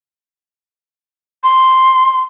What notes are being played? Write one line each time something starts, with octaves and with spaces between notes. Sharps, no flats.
C6